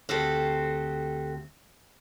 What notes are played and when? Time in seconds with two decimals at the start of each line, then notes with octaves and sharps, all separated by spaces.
0.09 D2 C4 F#4 G4 A4